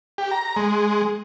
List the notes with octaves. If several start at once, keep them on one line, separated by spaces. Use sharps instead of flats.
G4
A#5
G#3